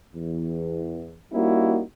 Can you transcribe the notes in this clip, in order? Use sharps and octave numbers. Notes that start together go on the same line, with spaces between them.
E2
G3 A#3 C#4 D#4 E4 F#4